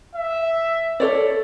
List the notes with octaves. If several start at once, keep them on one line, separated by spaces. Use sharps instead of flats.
E5
A4 C#5 D5